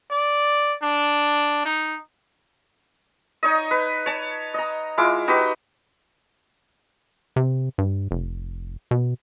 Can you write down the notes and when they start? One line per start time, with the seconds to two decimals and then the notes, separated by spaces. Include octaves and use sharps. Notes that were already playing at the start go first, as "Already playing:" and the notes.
0.10 D5
0.82 D4
1.65 D#4
3.43 D#4 C#5 D#5
3.71 B4
4.06 C#5 A5
4.54 D#5 A#5
4.98 G#3 E4 F4 D6
5.28 D#4 F#4 G4 B4
7.36 C3
7.78 G2
8.11 F1
8.91 B2